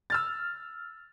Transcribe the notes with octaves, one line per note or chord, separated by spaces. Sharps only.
E6 F6 A6